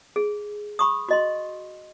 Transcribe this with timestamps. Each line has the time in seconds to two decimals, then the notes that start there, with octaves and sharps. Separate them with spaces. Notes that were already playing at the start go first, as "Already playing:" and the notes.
0.16 G#4
0.79 B5 C#6 D#6
1.09 F#4 D#5 C6